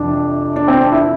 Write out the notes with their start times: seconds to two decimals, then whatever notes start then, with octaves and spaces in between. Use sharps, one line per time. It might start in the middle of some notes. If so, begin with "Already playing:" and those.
Already playing: F2 C3 E3 D4
0.56 D4
0.68 C4
0.81 D4
0.92 E4